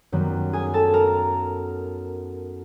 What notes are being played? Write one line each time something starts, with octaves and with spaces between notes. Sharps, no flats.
F#2 D#3 G3 B3
G#4 G#5
A4 A5
A#4 A#5